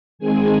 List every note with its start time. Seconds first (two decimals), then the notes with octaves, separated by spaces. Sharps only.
0.19 D#3 G#3 C4 G#4 G#5